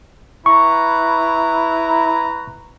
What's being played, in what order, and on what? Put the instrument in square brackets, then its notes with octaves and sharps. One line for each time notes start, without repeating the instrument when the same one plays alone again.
[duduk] E4 [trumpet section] B4 A#5 [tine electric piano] C#6